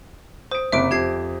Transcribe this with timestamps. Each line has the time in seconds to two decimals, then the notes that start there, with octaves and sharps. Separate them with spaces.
0.51 C5 D#6 D7
0.72 F#1 C3 E5 D6 D7
0.91 F2 G4 G#6 C7